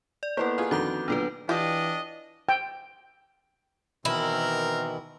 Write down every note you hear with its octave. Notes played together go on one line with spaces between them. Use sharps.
D5
A#3 B3 E4 A4 A#4 C5
F4 G#4
F2 D3 D#3 F#4 F#5 D6 G6
B1 A#2 D3 D4 A4 B4
E3 D4 F4 G4 D#5
G5
B2 D#3 E3 C4 E4 A#4